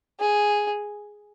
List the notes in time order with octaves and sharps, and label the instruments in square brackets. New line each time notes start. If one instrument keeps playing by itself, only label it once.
[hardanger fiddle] G#4